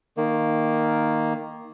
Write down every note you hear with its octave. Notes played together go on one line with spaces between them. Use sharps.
D#3 A#3